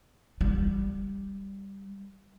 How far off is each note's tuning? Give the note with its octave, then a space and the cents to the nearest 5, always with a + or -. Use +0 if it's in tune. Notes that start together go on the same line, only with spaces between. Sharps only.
G3 +5